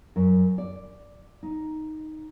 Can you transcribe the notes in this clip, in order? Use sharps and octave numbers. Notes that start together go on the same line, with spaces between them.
F#2
D5
D#4